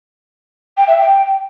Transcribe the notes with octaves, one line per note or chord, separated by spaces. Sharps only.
G5
E5
G5